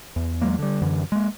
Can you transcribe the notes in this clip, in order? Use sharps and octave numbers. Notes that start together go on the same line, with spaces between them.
E2
E2 F#3 G#3 A#3
D3 G3
F#2 D3 E3
G#3 A#3